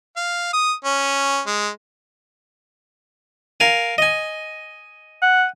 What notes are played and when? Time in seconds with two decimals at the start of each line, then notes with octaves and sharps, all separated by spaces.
0.17 F5
0.53 D#6
0.85 C#4
1.46 G#3
3.60 A#4 F5 G#5
3.98 D#5 G#5
5.22 F#5